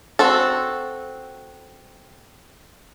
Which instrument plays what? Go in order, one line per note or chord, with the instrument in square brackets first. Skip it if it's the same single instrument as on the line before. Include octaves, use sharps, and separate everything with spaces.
[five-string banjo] C4 F#4 A4